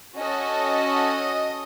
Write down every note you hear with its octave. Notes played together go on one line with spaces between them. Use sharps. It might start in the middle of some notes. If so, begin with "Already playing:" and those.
C#4 F#4 A4 D#5